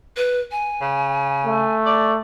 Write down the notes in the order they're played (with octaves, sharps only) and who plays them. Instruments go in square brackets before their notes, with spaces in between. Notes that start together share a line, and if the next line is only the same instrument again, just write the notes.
[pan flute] B4
G#5
[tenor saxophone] C#3
[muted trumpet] A3
[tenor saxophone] D5